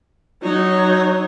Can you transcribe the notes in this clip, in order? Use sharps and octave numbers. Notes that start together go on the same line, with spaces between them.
F#3 D#4 C#5